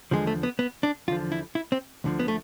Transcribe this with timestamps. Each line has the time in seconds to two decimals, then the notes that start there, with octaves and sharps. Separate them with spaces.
0.11 E2 D3 F3 G#3
0.27 A3
0.43 B3
0.59 B3
0.83 D4
1.08 E2 D3 F3 F4
1.32 E4
1.55 E4
1.72 C4
2.04 D2 D3 F3
2.19 B3
2.28 A3